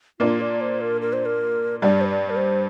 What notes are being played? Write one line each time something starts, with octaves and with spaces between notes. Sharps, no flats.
A#2 A#3 D4 F4
D5
C5
A#4
A#4
C5
A#4
G2 G3 D4 D5
C5
D5
A#4
C5